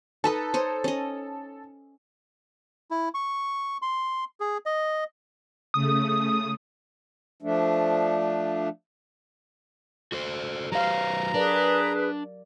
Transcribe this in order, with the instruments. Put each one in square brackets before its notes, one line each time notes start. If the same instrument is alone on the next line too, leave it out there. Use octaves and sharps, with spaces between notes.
[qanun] D#4 B4 D#5 [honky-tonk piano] A4
[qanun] C5 C#5 D#5
C#4 D#5
[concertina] E4
C#6
C6
G#4
D#5
[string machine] C#3 A3 [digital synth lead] D#6
[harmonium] F3 A3 D4
[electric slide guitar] F#4 A4 C5
[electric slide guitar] F#3 B4 C5 [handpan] G4 F5 [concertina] A#5
[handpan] F#3 A#4 D5 [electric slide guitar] D4 [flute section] G#4 B4